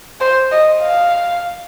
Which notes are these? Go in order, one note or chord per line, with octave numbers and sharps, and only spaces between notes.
C5
D#5
F5